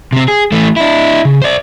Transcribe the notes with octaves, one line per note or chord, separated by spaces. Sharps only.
C3 C4
G#4
E3 A3
D4 E4
C#3
C5 D5